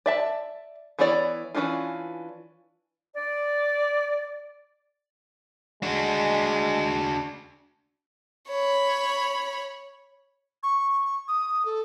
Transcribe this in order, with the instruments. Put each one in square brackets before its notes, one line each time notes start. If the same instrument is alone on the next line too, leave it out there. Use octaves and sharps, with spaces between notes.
[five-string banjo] D5 E5 A5
E3 B3 E4 C#5 D5
E3 F#3 C#4 D4 F4
[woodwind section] D5
[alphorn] G#3 [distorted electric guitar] D4 F#4
[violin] C#5 B5
[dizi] C#6
D#6
A4